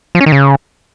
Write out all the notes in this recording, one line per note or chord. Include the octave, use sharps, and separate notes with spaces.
F3
C#4
D#3
C#3